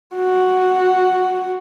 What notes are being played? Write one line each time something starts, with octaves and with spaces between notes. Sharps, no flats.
F#4